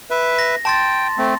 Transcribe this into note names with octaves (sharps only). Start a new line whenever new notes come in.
B4 E5
A#6
G5 A5 C6 A6
A3 C4